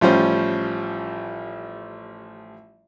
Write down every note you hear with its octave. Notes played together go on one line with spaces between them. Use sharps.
A1 F3 G3 C#4 C5